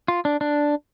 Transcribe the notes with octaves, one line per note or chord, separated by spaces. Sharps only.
F4
D4
D4